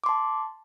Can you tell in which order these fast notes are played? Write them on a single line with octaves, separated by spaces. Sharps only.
D6 C6 A5